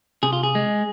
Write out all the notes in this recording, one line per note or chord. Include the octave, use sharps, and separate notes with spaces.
C3 G#4
F4
G#4
G#3